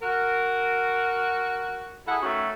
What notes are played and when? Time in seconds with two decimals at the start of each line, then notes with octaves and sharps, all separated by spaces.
0.02 F#4 A#4
2.07 E4 G#4 A4 F#5
2.23 D#3 A3 C#4 F#4